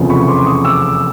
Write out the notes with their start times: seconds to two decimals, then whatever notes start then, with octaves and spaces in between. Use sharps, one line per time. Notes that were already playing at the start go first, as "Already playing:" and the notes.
Already playing: F1 E2 C#3 F3
0.10 B5 C#6
0.28 C6 D6
0.46 C#6 D#6
0.64 D6 E6